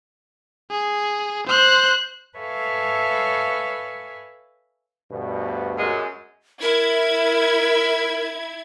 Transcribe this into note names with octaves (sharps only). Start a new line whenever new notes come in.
G#4
C5 F#6
A4 B4 C#5 E5 F5 G#5
D2 G2 B2
F#2 G#3
E4 A#4 G#6